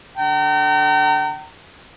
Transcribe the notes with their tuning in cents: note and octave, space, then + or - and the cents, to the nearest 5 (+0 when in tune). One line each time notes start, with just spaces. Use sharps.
D3 +0 G5 -40 A#5 -35